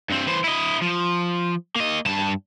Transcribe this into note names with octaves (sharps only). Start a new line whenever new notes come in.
G2 C4
E3 C5
E4 D#5
F3
A#3 D#5
G2 A5